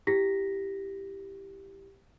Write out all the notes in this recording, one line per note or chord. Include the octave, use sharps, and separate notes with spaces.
E4 G4 A#6 B6